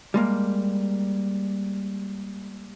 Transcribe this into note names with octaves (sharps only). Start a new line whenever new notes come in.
G3 G#3 A#3